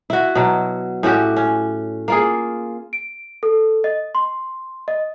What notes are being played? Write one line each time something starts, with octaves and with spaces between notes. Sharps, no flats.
E4 F#4
B2 F#3
A2 C#4 F#4 G4
C#4
A#3 F4 G#4
D7
A4
D#5
C6
D#5